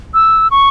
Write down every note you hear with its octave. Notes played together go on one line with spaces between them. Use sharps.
E6
C#6